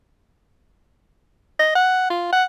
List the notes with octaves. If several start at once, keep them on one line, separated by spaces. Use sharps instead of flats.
D#5
F#5
F4
F#5